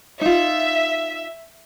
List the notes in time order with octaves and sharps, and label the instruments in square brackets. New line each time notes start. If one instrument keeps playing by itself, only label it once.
[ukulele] D#4 F4 [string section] E5